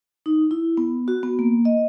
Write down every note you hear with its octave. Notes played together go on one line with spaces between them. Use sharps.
D#4
E4
B3
F#4
B3
A#3
D#5